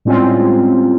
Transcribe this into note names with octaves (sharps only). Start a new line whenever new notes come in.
A2 G3 G#3 C4 C#4 F4